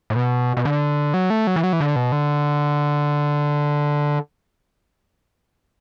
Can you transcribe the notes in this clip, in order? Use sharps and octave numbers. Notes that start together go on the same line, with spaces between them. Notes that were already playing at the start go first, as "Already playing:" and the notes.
A2
B2
B2
D3
F#3
A3
F#3
E3
F#3
E3
D3
B2
D3